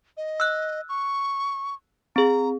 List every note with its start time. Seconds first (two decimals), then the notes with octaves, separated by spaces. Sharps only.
0.17 D#5
0.40 E6 F#6
0.89 C#6
2.16 C4 G#4 A#5